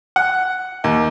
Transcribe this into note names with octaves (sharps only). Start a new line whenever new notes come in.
F#5
D#2